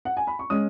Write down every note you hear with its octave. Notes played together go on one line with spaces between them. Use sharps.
F#5
G#5
B5
C#6
G#3 C#4 D#6